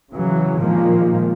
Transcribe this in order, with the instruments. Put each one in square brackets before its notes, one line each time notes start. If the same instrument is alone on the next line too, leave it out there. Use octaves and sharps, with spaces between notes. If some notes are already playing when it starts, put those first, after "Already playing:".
[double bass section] C#3 E3 F#3
A#2 D#3 F3 G#3 A#3